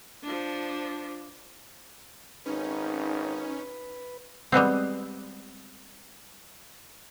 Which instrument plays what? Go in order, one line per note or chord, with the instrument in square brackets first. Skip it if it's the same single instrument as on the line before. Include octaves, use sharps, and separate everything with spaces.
[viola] F3 D4
[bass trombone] G#1 [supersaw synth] C#4 [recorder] D#4 [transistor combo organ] B4
[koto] G3 G#3 B3 C4